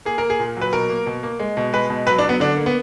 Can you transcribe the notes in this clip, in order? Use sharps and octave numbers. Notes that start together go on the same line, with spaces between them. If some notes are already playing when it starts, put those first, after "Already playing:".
A#3 G#4
A#3 A#4
G#4
A#2
F#3
B4
B2 A#4
A#3
B2
A#3
G#3
B2
G#3 B4
B2
F#3 B4
D4
F#3
B3
D3 D4
A#3
B3